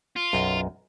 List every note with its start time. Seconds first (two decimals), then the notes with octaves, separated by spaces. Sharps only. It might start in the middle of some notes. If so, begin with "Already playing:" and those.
0.16 F4
0.33 B1 F#2 D#5